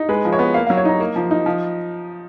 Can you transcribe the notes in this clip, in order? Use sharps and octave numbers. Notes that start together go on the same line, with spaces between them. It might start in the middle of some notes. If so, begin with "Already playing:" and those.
Already playing: D#4
G#3 B4
F3
C#5
B3
A#3 F5
F5
F#3
C#5
D#4 A#5
A#3
F3
D#4
F3